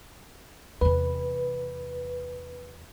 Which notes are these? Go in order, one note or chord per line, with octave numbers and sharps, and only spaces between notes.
E2 C3 B4